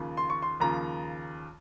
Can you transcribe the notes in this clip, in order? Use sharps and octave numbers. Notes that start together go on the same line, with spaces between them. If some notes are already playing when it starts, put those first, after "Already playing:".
Already playing: D#2 C#3 F3
C6
C#6
C6
D#2 C#3 F3 A#5